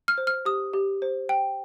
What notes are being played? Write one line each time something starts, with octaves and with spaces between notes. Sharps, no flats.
F6
C5
F6
G4 D#6
G4
C5
G5